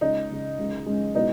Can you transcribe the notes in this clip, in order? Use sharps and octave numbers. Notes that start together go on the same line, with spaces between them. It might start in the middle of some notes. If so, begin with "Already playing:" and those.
C#2 C#3 G#3 D#4
C#2 C#3 G#3
C#2 C#3 G#3
C#2 C#3 G#3
B2 G#3 B3 D#4 E4